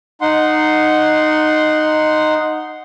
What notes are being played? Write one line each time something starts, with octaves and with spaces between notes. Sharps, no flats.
D#4 F#5 C6